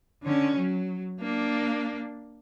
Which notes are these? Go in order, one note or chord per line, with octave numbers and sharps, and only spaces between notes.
D3 C#4
F#3
A#3 D4